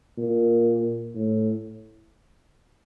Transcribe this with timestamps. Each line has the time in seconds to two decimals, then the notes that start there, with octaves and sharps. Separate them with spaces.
0.18 A#2
1.15 A2